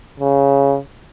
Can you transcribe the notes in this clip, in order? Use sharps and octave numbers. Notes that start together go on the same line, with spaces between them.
C#3